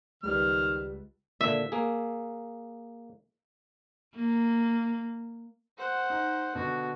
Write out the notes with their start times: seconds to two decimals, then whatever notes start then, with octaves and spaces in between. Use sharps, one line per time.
0.23 C#2 D#3 G3 B4 F6
1.41 A#2 D3 E5
1.72 A#3 G#4
4.16 A#3
5.78 C5 F#5
6.10 D#4
6.55 B2 D3 F#4